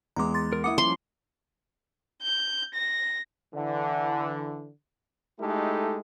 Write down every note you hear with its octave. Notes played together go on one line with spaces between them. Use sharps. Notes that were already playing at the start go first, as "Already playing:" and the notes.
E2 G#3 A#5 D6
C6 A6
A#4
A#3 E4 F#5 D6 D#6
F3 G3 C#4 C6
G6
A#6
D3 E3
G#3 A3 D#4 E4 G4 A4